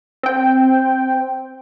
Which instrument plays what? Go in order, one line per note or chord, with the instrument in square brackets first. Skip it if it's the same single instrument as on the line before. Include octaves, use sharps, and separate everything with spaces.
[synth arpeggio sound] C4 G5